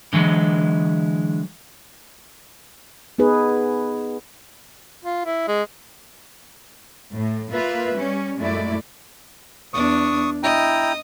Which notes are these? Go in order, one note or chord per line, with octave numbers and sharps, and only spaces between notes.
D3 E3 F#3 G#3
B3 D#4 G#4 B4
F4
E4
G#3
A2
A#3 F4 B4 E5
G3 C#4
F#2 A#2 G#3 A3 E4 D5
E2 D4 C#6 D#6
E4 D#5 G5 A#5